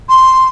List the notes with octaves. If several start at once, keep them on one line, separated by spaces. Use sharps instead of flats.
C6